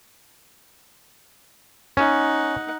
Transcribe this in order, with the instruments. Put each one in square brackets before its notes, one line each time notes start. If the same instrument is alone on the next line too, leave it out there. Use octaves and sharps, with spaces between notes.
[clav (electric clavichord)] C#4 [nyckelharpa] D#4 F#5